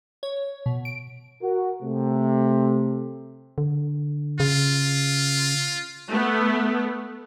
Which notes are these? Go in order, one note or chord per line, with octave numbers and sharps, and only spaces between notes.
C#5
B2
D7
F#4 A#4
C3 A3
D3
C#3 F4
A3 B3